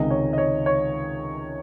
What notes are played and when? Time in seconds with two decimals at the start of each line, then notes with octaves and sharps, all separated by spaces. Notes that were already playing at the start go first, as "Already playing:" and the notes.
Already playing: C#2 C3 D#3 G#3 D#5
0.10 C#5
0.33 D#5
0.38 C#5
0.66 C#5